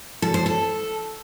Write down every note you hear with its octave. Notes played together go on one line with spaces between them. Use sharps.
A4
C5
A4